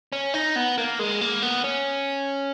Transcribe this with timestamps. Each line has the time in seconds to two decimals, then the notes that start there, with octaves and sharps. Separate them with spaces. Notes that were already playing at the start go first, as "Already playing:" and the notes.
0.13 C#4
0.34 D#4
0.56 B3
0.78 A#3
0.99 G#3
1.21 A#3
1.42 B3
1.64 C#4